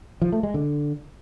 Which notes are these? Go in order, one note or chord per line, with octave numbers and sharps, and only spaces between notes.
F3
A3
G#3
D3